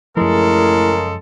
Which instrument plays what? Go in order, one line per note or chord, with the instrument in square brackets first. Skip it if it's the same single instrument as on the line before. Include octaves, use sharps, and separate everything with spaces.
[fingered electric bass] F#2 F3 [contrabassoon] A2 [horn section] C#3 G#3 A4 [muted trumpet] A#4